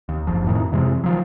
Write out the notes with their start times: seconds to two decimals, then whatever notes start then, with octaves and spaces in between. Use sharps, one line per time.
0.09 D#2
0.27 F#1 F3
0.45 F2 A2 D#3
0.72 F2 C3 E3 G#3
1.04 D#3 F3 F#3